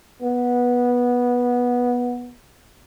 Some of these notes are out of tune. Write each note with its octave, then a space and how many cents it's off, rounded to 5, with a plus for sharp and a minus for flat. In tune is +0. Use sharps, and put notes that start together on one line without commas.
B3 -15